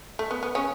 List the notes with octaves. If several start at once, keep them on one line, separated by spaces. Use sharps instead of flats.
A3
B3
B3
C#3 C#4